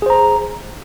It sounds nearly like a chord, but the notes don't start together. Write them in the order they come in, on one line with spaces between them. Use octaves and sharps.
G#4 C5 A#5